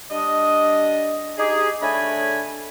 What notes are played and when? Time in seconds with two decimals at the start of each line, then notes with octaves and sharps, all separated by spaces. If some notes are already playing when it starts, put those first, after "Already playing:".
0.11 G3 D4 D#5
1.38 D#4 G4 G#4
1.82 D3 A3 D4 C#5 G#5 B5